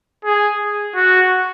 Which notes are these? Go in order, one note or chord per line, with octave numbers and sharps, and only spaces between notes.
G#4
F#4